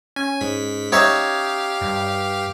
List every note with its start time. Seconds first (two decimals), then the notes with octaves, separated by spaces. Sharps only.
0.16 C#4 G#5
0.41 G#2 B6
0.92 D#4 G4 C#5 E5 F5
1.81 G2